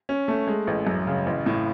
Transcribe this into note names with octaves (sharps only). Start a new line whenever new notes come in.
C#4
A3
G#3
A1
F#2
C#3
A1
A2